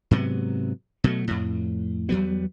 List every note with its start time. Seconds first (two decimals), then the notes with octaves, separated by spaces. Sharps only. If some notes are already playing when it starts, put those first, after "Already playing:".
0.11 G#2 C3 F#3 B3
1.04 B2 F#3 A3
1.27 F2 A2
2.09 E2 F#3 G3 B3